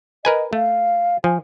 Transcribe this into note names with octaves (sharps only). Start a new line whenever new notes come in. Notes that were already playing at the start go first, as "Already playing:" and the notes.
A#4 B4 D#5 G#5
A3 F5
F3 G#5